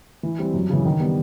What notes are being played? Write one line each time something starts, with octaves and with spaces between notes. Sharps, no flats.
E3
G3 C4
F#2
C#3 E3
D#3
G3 B3